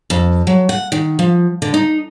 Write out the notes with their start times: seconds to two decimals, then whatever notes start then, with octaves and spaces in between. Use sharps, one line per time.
0.10 F2
0.47 F#3
0.69 F#5
0.92 D#3
1.19 F3
1.62 D3
1.74 D#4